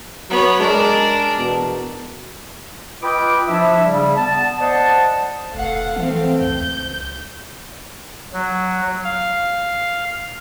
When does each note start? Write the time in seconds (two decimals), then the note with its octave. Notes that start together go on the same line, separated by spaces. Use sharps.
0.30 F#3 B3 C#5
0.59 G#3 D4 A#4
1.37 E2 B2
3.03 F4 B4 D#5 G5 B5 D6
3.48 F3 D4 E4 E5
3.83 C#3 G3
4.17 B3 A5
4.58 C5 D5 D#5 F#5 A5
5.55 E1 A3 F5 F#5
5.96 E3 A3 C4 F5
6.41 C#2 G6
8.33 F#3
9.04 F5